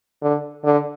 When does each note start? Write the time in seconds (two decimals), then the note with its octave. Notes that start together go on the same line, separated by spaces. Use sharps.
0.22 D3
0.64 D3